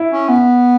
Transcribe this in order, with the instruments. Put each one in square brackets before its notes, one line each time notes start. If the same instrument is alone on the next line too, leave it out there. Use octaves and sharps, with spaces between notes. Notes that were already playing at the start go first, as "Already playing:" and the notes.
Already playing: [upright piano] E4
[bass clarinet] C#4
B3